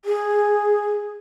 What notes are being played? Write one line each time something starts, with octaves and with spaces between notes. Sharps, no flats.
G#4